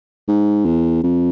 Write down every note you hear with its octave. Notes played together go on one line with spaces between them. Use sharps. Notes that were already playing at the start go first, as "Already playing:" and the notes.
G#2
E2
F2